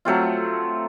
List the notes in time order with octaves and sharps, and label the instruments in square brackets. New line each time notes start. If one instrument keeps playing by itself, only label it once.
[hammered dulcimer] F#3 A3 C4 F4